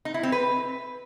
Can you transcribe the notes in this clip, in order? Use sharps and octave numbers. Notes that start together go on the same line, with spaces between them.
D#4
E4
C4
B4